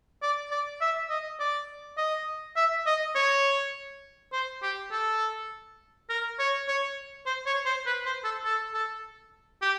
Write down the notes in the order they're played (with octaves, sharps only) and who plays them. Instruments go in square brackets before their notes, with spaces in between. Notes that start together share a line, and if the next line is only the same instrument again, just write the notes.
[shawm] D5
D5
E5
D#5
D5
D#5
E5
D#5
C#5
C5
G4
A4
A#4
C#5
C#5
C5
C#5
C5
B4
C5
A4
A4
A4
G4